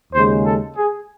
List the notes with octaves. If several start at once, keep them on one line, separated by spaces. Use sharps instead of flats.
D#2 C#3 G#3 C5
A4
G#4